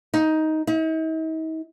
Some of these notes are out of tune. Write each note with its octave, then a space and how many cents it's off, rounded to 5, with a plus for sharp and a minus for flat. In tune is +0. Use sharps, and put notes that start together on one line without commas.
D#4 +10
D#4 +45